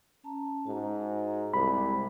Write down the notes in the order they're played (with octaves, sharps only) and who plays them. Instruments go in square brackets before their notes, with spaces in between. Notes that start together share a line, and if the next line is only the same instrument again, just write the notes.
[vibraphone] C#4 A5 A#5
[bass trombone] G#2 [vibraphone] F#4 A#5
[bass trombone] C2 [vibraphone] G#3 D6 [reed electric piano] B5